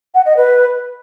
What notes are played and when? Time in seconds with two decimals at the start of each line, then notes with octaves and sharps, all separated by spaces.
0.15 F#5
0.26 D#5
0.37 B4